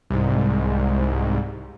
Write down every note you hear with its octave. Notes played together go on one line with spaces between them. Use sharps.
C2 G#2